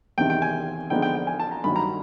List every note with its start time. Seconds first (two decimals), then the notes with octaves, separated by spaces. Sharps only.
0.18 E2 C3 D#3 G5
0.30 G5
0.42 G#5
0.90 D3 F3 G#3 B3 D#4 G5
1.02 G5
1.15 G5
1.27 G#5
1.40 A5
1.51 A#5
1.64 G2 D#3 F#3 B5
1.76 A#5